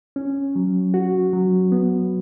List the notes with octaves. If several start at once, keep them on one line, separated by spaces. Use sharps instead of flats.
C#4
F#3
F#4
F#3
B3